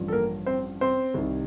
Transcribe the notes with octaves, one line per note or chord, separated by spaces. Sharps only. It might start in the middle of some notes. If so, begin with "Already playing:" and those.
Already playing: A1 G2 F3
A4
A#3 A#4
C4 C5
C4 C5
C2 C3 D#3